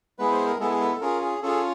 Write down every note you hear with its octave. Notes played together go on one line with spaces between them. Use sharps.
G#3 B3 E4 G#4 B4
C5
A#4
G#3 B3 E4 G#4 A4
G#4
A4
A4
C#4 F4 G#4 A#4
G#4
C#4 F4 G#4 A4